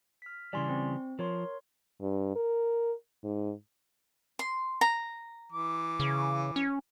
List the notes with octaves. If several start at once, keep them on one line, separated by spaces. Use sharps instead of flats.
F6 B6
C#3 E3 G3 D5 G#5 C6
C4
F3 A#4 C#5 C6
G2
A#4
G#2
C6
A#5
E3 D6
C#3
C#4